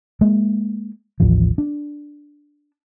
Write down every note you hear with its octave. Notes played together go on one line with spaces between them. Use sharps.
G#3 A#3
A1 D#2 A2 F3
D4